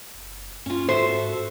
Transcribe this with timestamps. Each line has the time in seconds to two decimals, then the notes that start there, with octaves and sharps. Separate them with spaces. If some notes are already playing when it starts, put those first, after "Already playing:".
0.15 F#1
0.66 G2 C#4 F4
0.88 G#2 F#4 A4 C5 E5